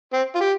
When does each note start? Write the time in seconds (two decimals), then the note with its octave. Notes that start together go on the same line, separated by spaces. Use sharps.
0.13 C4
0.35 F4
0.40 G4